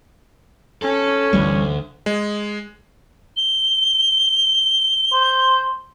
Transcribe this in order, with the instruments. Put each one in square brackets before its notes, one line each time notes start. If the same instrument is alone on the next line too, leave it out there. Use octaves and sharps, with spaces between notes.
[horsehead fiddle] C#4 [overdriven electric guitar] A4
[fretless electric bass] G1 E3 G3 [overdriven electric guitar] D2
[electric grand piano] G#3
[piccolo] G7
[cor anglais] C5